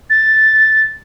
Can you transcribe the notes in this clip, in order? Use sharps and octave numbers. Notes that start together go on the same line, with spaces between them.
A6